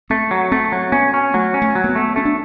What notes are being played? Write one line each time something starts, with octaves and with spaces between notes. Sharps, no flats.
A3 C4
F#3
A3 C4
F#3
B3 C#4
C#4
F#3 A3
C#4
A3
F#3
A#3
B3
A3
A3 C#4
D4